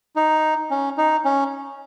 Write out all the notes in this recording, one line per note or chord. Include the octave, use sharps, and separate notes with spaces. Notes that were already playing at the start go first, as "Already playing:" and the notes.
D#4
C#4
D#4
C#4